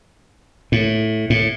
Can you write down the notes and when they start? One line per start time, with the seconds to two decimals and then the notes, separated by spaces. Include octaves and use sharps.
0.72 A2
1.30 A2